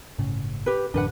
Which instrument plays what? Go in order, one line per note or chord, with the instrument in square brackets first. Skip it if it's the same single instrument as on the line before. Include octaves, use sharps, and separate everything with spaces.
[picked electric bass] G1 A2 C#3
[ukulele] G4 B4
[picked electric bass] A1 F#2 D3 [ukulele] D4 B4 F#5